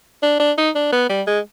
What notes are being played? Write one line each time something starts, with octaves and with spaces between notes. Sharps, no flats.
D4
D4
D#4
D4
B3
G3
G#3